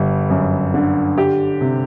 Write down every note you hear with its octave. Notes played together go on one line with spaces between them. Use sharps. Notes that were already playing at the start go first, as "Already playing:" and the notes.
Already playing: G1 G3
F#2
D3
G4
C3